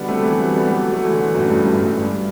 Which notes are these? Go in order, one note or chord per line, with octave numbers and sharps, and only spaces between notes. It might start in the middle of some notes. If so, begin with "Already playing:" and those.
Already playing: B2 D3 G3 B3
A3 C4
E3 G3
F#3 A3
G3 B3
F#3 A3
F#3 A3
E3
D3 F#3
F#2 A2
G2
F#2
G2
G2